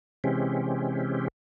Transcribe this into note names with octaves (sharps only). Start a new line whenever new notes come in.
C3 E3 G#3 C4 C#4 G4